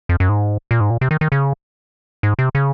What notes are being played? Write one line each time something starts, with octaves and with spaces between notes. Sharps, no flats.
F2
F#2
G#2
A#2
G#2
A#2
C3
D#3
D#3
C#3
G#2
C3
C#3